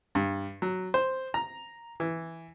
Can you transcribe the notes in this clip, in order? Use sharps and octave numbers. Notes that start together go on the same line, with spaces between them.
G2
F#3
C5
A#5
E3